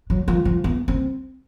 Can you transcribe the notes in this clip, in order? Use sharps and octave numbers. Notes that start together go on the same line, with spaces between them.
F#3
F3
F3
B3
C4